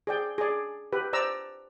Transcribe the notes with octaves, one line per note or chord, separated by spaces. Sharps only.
G#4 D5 G5
G#4 D5
G4 B4
C5 D5 A#5 E6